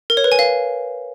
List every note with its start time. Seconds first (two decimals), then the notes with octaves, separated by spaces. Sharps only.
0.10 A#4
0.17 C#5
0.24 B4
0.32 G#5
0.39 F5